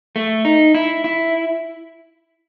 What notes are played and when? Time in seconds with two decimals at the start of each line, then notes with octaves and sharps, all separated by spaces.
0.16 A3
0.45 D#4
0.75 E4
1.04 E4